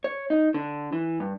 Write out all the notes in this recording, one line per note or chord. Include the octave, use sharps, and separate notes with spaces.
C#5
D#4
D3
E3
G2